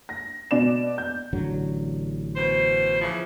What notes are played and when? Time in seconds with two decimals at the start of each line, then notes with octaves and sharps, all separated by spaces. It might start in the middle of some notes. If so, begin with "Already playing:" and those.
0.09 A#6
0.51 B2 D5 E7
0.98 G6
1.33 A1 D3 F#3
2.35 B2 C5
3.01 C#3 E3 F3